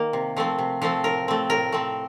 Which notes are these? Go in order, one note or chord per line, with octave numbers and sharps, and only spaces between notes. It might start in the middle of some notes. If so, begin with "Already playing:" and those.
Already playing: D#3 A#3
C3
F3 A3 C4
C3
F3 A3 C4
A2 A#4
A3 C4
A2 A#4
A3 C4